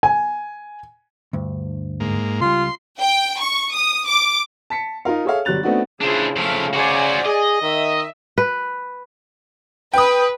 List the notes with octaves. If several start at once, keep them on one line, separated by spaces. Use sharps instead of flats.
G#5
D2 G2
G#2 A#3
C#2 G3 F4 C6
G5
C#6
D#6
D6
A5 B6 C#7
D#4 F4 A#4 F5
G#4 A4 C#5 E5 F5
G1 F#3 G3 F#6 A6 F7
A3 B3 C4 D4 D#4 F#4
C#3 D4 E4 F4 G#4 C5
F3 A3 F5
F#4 C5 D5 G#5
G#4 D#5
D#3 E5
B4
B4 G5 D#6